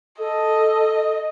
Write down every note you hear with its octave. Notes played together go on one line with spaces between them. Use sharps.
A4 D#5